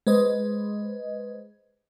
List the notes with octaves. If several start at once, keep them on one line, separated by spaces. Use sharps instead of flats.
G#3 B4 C5 D#5